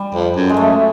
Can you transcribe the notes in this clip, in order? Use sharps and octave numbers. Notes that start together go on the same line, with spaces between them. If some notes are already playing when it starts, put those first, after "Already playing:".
Already playing: G3
F2
F#2
G#3
F#2 A3